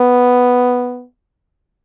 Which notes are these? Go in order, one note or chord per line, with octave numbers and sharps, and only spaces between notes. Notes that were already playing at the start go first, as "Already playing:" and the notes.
Already playing: B3